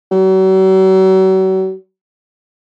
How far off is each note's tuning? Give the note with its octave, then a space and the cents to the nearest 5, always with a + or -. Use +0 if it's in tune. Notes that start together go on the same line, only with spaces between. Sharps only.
F#3 +40